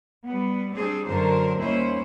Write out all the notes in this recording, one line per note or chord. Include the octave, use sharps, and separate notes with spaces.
G3 B3
G3 C4 D4 G#4
F#2 D3 F#3 A#4 C5
D#2 G3 C#4 E4 C5